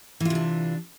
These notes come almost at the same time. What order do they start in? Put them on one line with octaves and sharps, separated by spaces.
E3 F4 C3 D4